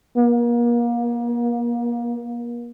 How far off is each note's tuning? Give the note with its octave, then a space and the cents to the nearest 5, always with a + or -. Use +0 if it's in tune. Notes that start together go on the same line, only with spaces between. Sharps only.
A#3 +35